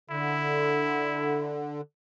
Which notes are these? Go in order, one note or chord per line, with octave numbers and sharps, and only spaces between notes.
D3 E4